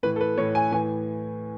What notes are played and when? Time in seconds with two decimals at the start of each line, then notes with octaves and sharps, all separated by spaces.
0.03 A2 E3 B4
0.16 A4
0.21 B4
0.37 A2 E3 C#5
0.55 G#5
0.72 A2 E3 G#5